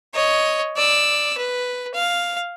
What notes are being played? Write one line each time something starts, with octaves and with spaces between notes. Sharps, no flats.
C#5 D#5
D5 E6
B4
F5